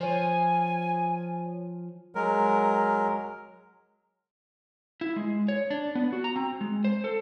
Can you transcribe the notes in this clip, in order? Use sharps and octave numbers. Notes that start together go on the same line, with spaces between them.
F3 C5 C#5 G#5
F#3 G#3 A#4
E4
G#3
C#5
D4
B3
F#4
A#5
C4
G#3
C5
A4